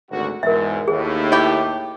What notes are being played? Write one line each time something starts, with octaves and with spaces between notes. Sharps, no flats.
G#1 D2 F#4
E2 G#2 B2 A#4 E5
D#2 A2 G#4
E4 G4 D#5 D6